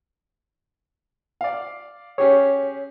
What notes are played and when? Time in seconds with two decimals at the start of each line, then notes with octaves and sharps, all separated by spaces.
1.41 D5 F5
2.18 C#4 G4 G#4 C#5